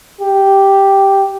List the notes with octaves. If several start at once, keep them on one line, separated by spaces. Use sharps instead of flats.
G4